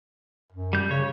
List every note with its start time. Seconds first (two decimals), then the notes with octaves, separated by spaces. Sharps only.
0.52 F#2
0.73 G3 G6
0.91 C#3 C#5